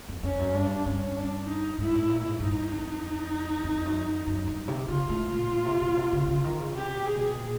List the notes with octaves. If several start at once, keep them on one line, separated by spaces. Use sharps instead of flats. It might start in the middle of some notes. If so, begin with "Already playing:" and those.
F2
F2 C#4
F#2
G2 D4
G2 C#4
D4
D#4
G#2 E4
A2
A#2
G#2
G2 D#4
F2
F2
F#2
F#2
G2
C3
C#3 F4
A2
A#2
A#2
C3
B2
C3
C#3
C#3
D#3
C#3
C3 G4
B2
G#4
B2
A#2